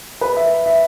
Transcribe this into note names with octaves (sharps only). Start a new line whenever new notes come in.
B4
E5
E5